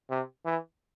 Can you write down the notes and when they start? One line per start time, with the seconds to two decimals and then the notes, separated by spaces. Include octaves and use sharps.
0.10 C3
0.45 E3